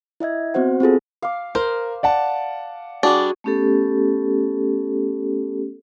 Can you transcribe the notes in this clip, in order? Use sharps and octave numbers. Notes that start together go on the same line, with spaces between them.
E4 D#5 E5 G#6
B3 C4 F#4 C5 F#5
C4 F4 G#4 A4
F5 D6
A#4 C5
D5 F#5 A5
G3 D4 F#4 G#4 G#5
A3 B3 C#4 G4 A4